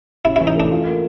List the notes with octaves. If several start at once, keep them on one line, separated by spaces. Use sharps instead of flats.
C#4 E4
E4
E3
D#4
A3 D4
F4
A#3